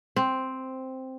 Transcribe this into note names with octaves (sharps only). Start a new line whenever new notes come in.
C4